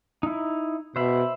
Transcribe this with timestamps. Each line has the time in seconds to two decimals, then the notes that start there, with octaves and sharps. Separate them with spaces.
0.23 D#4 E4
0.96 B2 C5 E5 B5